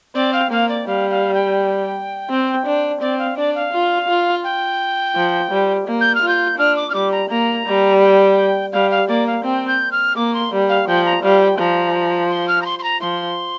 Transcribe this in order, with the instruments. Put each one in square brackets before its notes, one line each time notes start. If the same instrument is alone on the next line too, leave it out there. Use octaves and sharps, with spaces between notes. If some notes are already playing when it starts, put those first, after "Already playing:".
[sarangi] C4 [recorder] D5
[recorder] F5
[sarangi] A#3 [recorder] F5
[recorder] D5
[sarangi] G3 [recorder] F5
[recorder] F5
G5
[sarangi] C4
D4
[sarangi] C4 [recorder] D5
[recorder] F5
[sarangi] D4 [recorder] D5
[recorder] F5
[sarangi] F4
F4
[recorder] G5
[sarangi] F3
G3
A#3
[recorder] G6
F6
[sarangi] F4
[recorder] G6
[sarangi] D4 [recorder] F6
[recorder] D6
F6
[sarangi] G3 [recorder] D6
[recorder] A#5
[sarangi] A#3 [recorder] A#5
[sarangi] G3
[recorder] G5
[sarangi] G3 [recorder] F5
[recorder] F5
[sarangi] A#3 [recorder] D5
[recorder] F5
[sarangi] C4 [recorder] G5
[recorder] G6
F6
[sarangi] A#3 [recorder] D6
[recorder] C6
[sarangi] G3
[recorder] F5
[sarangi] F3 [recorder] G5
[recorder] A#5
[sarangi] G3 [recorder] F5
[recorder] G5
[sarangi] F3 [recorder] A#5
[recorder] C6
F6
A#5
C6
C6
A#5
[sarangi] F3 [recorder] C6